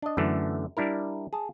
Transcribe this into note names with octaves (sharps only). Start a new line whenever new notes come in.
D4 D#5
F#2 D3 E3 A3
G3 D4 E4 A#4
G#4 A5